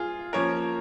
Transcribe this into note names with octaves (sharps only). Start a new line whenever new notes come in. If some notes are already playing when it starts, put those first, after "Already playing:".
Already playing: F4 G#4
F3 A#3 C#4 A#4 C#5